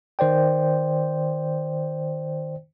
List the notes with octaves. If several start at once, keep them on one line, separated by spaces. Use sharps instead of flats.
D#3 C5 D5 G5